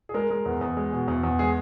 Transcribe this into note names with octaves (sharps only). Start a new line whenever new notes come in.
G#4
G#3 A#4
G#3
E2
E2
G#3
B2
E2
E2
G#3 G#4